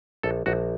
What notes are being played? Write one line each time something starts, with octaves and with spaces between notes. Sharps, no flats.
A#1 A4
A#1 F#4